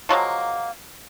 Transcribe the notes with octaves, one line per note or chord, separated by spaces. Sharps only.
F3 F#3 G#3 A#3